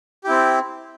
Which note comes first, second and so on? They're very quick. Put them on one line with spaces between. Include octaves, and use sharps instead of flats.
G4 E4 C4